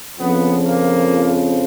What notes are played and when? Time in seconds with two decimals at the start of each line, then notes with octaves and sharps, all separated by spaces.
0.18 F2 C#3 F3 B3
0.64 A#3